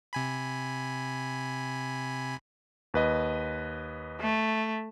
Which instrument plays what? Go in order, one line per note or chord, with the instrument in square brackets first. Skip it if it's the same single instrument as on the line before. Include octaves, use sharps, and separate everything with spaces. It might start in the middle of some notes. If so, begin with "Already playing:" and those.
[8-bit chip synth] C3 G#5 B5
[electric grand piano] D#2 B4 D#5
[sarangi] A3